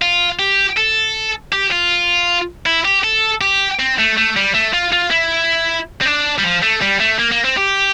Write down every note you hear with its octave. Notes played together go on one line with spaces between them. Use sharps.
F4
G4
A4
G4
F4
E4
G4
A4
G4
C4
A3
A3
G3
A3
F4
F4
E4
C4
D4
G3
F3
A3
G3
A3
A#3
A#3
C4
G4